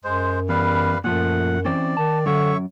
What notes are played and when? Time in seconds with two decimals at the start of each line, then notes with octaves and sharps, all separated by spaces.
0.04 F#2 G#3 C5
0.49 E2 G3 B4 F5
1.04 F#2 A#2 F3 A3 F#5
1.65 E3 C4 C#4 D5
1.97 D#3 A5
2.26 F#2 D3 C#5 E5 C#6